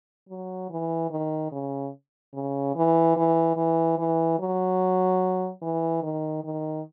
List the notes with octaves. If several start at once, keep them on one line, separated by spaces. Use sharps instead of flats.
F#3
E3
D#3
C#3
C#3
E3
E3
E3
E3
F#3
E3
D#3
D#3